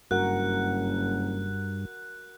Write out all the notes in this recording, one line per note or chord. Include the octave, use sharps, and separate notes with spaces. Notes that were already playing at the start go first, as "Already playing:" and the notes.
F#1 G2 F#4 A#4 F#5 F#6